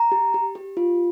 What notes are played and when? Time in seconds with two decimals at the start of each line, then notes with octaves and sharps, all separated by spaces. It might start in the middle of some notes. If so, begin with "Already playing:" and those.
Already playing: A#5
0.12 G4
0.34 G4
0.55 G4
0.77 F4